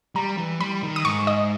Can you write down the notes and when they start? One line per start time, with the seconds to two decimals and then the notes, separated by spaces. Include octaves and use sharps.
0.15 G3 A#5
0.37 E3
0.61 G3 B5
0.83 D#3
0.96 D#6
1.04 G#2 C#6
1.27 D#5